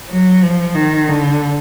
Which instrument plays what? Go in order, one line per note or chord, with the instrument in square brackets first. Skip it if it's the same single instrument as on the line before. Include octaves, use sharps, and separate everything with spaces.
[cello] F#3
F3
D#3
D3